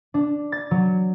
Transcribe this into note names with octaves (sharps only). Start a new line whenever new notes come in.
D4
A6
F#3